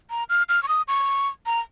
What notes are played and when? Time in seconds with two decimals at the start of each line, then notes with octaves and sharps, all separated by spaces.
0.10 A#5
0.29 F6
0.49 F6
0.63 C#6
0.68 D#6
0.88 C#6
1.46 A#5